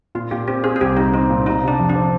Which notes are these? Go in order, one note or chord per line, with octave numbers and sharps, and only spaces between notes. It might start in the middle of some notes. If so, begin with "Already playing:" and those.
A#2 F4
A#2 G4
C4 G4
C4 G#4
G#4
C2 G4
C4 D#4
C4 D#4
A#2
C3 D#4
C3
D4
F2
D4
C4